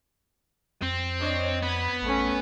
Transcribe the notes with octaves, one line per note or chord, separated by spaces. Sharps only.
F2 C4
D4 C#5 D#5
B3 B5 G#6
A1 A3 C#4